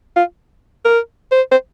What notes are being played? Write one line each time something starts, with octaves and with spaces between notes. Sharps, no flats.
F4
A#4
C5
C5